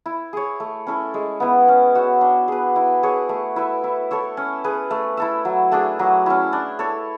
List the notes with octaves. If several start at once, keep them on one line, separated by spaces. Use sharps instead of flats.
E4
G#4 C#5
A3
C#4 E4 A4
G#3
B3 E4 B4
C#4
F#4 C#5 E5
D4
G#4 B4
E4
G#4 C#5
A3
E4 B4 E5
E4
A4 C#5 E5
C#4
G#4 B4
A3
E4 A4 E5
F#3
A3 D4 G#4
F#3
C#4 E4
D4
A4 C#5